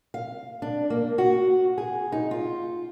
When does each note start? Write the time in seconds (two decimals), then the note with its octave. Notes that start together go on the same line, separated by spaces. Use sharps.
0.14 F5
0.62 D4
0.90 A#3
1.18 F#4
1.78 G#4
2.12 D#4
2.31 F4